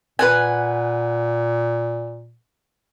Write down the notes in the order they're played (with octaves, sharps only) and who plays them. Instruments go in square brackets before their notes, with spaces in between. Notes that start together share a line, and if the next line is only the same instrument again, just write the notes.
[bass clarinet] A#2 [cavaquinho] B4 F#5 G#5